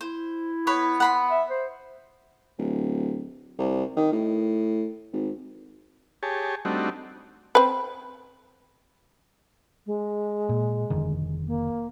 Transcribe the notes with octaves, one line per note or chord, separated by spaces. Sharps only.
E4 C5
B3 B4 C#5 B5
F#5 B5 C6
E5
C5
D1
C2
D#3
A2
G#1
G4 G#4 C#5 A5
G3 A3 C4 D4 D#4 F#4
C4 B4
G#3
A#2
F1 D3 D#3
A#3